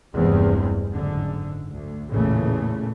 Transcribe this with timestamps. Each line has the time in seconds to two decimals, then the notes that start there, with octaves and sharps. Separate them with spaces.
0.13 F1 E2 G2 G#3 C4
0.92 F#1 G#2 D3
1.71 D2
2.10 A1 E2 A#2 C#3 E3 A3